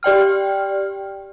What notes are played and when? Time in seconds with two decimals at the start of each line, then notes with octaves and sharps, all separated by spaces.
0.03 G4 D5 G5 F6